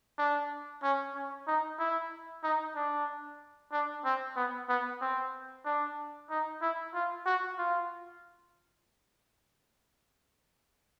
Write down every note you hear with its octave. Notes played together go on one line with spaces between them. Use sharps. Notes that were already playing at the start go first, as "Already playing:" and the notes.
D4
C#4
C#4
D#4
E4
D#4
D4
D4
C4
B3
B3
C4
D4
D#4
E4
F4
F#4
F4